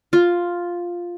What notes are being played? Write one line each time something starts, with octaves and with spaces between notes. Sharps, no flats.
F4